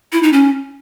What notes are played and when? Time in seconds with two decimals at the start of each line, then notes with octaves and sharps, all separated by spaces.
0.13 E4
0.23 D#4
0.33 C#4